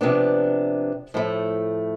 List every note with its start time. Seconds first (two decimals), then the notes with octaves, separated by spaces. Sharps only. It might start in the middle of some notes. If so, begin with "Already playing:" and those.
0.01 C3 F3 B3 D4
1.14 A2 F3 A3